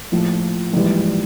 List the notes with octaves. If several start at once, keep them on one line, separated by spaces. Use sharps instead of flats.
A#1 A2 F3
A#1 G#2 E3 G3